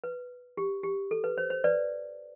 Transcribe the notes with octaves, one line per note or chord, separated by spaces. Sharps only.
B4
G4
G4
A4
B4
C5
C5
B4 D5